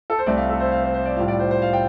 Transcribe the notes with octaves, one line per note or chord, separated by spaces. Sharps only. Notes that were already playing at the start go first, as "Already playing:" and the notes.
A4
C5
C2 C3 A3 D5
F5
A4
C5
F5
C5
C5
D5
A2 G3 F4 F5
D5
C5
C5
F5
G5